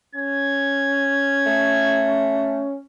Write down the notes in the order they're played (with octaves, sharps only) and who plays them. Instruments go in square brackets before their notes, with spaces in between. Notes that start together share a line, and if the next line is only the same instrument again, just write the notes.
[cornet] C#4 [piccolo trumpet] G#6
[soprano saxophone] A3